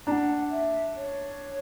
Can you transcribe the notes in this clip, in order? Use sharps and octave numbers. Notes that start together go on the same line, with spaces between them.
D4 F#5 A#5
E5
C#5